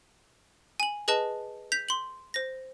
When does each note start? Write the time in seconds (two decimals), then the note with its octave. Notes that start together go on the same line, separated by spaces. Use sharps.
0.80 G#5 F#7
1.08 G#4 B4 D#5 A5
1.72 G6 B6 F7
1.89 C6 F#7
2.34 C5 A#6